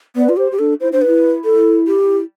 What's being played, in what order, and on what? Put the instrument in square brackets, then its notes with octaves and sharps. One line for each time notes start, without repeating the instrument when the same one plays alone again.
[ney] B3 [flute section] B4 D5
[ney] F4
[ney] G4 [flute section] C5
[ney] G4
[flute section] D4 [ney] A4
[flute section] E4 [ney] C5
[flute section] D4 [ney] C5
[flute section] E4 [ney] B4
[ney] A4
G4